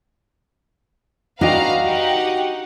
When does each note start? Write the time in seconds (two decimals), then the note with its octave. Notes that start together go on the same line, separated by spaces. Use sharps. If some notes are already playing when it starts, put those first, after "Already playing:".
1.41 D4 F#4 B4 D#5 F5 G5 A#5
1.82 D#4 G4 F#5